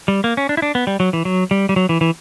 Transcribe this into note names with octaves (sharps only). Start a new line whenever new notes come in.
G3
A#3
C#4
D4
E4
D4
B3
G3
F#3
E3
F#3
G3
G3
F#3
E3
E3